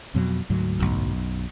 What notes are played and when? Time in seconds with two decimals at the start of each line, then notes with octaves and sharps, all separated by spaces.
0.15 F2 B2 F#3
0.50 D2 G#2 F#3
0.80 B1 F#2